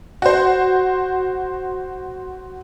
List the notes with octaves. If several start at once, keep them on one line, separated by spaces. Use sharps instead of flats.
F#4 C5